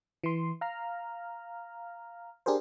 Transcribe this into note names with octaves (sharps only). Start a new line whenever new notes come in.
E3 C6
F5 A#5 F6
D4 G4 G#4 A#4 C5